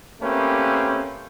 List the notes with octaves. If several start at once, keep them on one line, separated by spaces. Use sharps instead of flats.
A3 A#3 C4 C#4 G4 B4